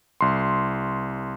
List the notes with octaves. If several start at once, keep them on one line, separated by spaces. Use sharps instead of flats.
C2 C6